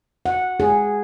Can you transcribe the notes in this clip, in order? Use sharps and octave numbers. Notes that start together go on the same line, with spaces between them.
F#5
G#4